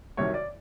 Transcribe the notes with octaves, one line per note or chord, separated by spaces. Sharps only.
C2 C3 D#3 F#3 C#5
D5